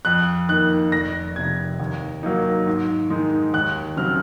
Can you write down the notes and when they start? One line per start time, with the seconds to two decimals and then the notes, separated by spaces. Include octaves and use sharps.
0.05 F2 F#6
0.49 D#3 A#3 D#4 F#6
0.92 F1 A#6
1.36 F2 C3 G#6
1.80 D#2
2.23 D#3 F#3 A#3 D#4
2.67 G#2
3.10 D#3 G#3 D#4
3.54 D#2 F#6
3.97 C#3 F#3 C4 F6